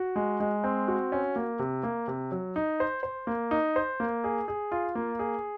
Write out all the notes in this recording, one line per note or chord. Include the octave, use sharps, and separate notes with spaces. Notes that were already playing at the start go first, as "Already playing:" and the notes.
Already playing: F#4
G#3
G#3
C4
F#4
C#4
A#3
C3
A#3
C3
F#3
D#4
C5
C5
A#3
D#4
C5
A#3
G#4
G#4
F4
A#3
G#4